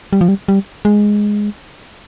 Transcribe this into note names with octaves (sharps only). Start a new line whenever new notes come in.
G3
F3
G3
G3
G#3